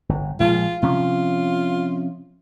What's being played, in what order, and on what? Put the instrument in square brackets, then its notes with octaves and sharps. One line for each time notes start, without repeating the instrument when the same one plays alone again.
[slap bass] G1
[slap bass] A#1 F3 G#3 [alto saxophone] F4
[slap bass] C3 F3 C#4 [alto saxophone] F4